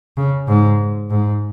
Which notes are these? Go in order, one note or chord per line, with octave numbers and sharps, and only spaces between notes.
C#3
G#2
G#2